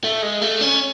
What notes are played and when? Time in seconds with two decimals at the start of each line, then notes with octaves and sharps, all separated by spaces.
0.04 A3
0.22 G#3
0.42 A3
0.61 C#4